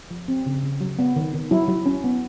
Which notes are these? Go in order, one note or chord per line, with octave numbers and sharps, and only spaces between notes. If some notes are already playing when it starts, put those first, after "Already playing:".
F3
C4
C#3
C#3
F#3
B3
D#3
D#3
F#3 E4
F#3
C#4
B3